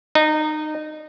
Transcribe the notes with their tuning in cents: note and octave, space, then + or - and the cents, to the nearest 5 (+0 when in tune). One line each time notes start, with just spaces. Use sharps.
D#4 -20